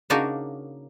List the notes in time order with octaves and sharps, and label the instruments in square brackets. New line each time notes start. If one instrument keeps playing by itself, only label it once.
[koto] C#3 A#3 D4 D#4 F#4 A#4